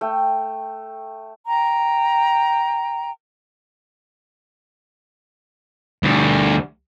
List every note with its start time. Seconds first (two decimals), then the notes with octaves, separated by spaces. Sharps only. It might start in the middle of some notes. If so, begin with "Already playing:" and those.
0.01 A3 G5
1.47 G5 A#5
6.03 D2 G3